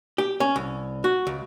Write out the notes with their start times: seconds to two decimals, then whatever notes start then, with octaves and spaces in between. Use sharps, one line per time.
0.18 G4
0.40 C#4
0.56 C2
1.04 F#4
1.27 C#2